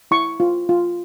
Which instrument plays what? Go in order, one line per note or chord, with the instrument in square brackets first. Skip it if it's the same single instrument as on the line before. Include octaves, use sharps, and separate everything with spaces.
[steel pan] E4 C#6
F4
F4